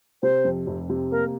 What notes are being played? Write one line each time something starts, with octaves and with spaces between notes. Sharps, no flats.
C3 C5
F2
F1
C3
A#3 A#4